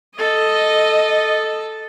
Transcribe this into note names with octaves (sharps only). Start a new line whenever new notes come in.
A4 D#5